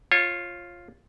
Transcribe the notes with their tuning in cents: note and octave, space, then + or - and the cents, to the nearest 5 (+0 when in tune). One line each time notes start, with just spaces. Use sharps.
F4 +0 C#5 -25